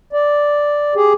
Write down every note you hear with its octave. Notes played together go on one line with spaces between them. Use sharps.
D5
G4 G#4